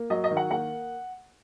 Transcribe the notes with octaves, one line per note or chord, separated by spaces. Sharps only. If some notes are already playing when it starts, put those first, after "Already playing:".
Already playing: A#3
F#3 D#5
D#5
D#3
F#5
A#3 F#5